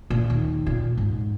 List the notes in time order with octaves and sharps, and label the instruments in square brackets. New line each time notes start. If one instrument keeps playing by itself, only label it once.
[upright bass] A#2
D#2
A#2
G#2